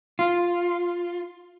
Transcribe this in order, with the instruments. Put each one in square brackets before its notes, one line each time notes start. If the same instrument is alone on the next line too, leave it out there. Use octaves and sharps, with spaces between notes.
[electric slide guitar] F4